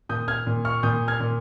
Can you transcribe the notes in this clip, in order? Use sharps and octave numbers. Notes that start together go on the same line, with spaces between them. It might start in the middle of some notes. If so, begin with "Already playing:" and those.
A#2 D#6 G6
F6 G#6
A#2
C#6 F6
A#2 D#6 G6
F6 G#6
A#2